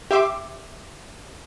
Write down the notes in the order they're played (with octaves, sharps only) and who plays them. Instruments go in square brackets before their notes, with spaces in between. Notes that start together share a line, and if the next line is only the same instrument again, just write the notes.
[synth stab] G4 E5 C6 D6